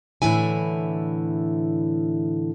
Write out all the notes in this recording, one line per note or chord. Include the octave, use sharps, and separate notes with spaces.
A2 D3 E3 E4 G#5